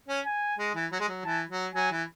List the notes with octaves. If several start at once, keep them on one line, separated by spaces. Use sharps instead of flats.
C#4
G#5
G#3
E3
F#3
G#3
F#3
E3 A5
F#3
F#3 G#5
E3